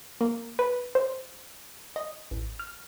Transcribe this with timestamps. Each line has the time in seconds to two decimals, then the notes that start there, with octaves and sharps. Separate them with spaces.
0.21 A#3
0.59 B4
0.95 C5
1.96 D#5
2.31 A1
2.59 F6